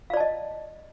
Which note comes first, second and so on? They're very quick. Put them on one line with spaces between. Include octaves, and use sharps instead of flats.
F5 D5 A5 D#5